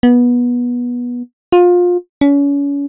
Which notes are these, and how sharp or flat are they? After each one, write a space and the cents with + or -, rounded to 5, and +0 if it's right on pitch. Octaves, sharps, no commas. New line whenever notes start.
B3 -20
F4 +25
C#4 +35